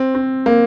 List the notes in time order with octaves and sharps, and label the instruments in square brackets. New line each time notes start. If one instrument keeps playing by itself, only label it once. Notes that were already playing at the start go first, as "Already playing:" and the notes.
Already playing: [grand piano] C4
C4
A#3